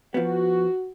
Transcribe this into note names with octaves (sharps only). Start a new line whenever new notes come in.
F3 B3 F#4